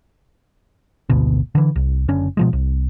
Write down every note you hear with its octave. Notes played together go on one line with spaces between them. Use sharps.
G#1 D2 B2
D3 E3
C2
F#1 D3 C#4
B2 F3 G#3
C2